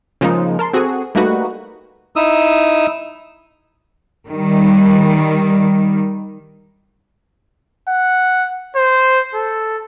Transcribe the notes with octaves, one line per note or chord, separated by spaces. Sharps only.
C#3 F3 G#3 A#3 D#4
A#4 A5 C6
C4 F#4 G#4 A4
G3 A3 A#3 D#4 F#4 B4
D#4 E4 D#6 E6
D#3 G3
F#5
C5
A4